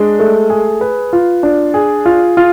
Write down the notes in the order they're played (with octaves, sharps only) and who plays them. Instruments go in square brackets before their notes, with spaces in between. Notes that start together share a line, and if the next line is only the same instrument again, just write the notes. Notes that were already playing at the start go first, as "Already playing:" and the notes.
Already playing: [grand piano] G#3 D4
A3
G#4
B4
F4
D4
G#4
F4
F4